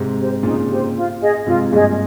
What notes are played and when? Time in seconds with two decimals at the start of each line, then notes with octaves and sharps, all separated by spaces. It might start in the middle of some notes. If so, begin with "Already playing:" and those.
Already playing: G#2 C3
0.18 G4 C5
0.43 A#2 C#3 D#4
0.70 G4 C5
0.96 F4
1.21 G#4 D#5
1.47 G#2 C3 F4
1.72 G2 A#2 G#4 D#5